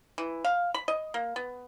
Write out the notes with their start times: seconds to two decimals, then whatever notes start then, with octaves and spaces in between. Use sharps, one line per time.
0.18 E3
0.45 F5
0.74 B5
0.88 D#5
1.14 A#3
1.36 B3